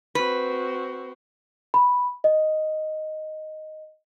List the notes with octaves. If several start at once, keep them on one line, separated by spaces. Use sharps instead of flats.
C4 F#4 B4
B5
D#5